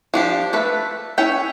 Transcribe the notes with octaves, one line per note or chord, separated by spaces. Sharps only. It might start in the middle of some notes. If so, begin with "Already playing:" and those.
F3 D4 G4
A3 A4 B4
C#4 E4 C#5 E5 G5